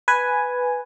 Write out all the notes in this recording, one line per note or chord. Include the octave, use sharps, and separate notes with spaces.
B4 G#5